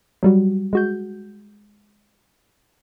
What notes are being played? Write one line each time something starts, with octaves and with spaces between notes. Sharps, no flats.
F#3 G3 F#4
G#3 F#4 G6